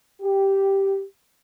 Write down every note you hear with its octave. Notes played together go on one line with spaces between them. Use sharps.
G4